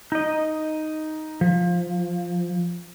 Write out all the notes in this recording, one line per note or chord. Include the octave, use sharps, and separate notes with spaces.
D#4 D#5
F3